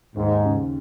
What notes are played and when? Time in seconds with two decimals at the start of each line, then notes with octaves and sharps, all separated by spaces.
0.16 D#2 G#2
0.45 C#3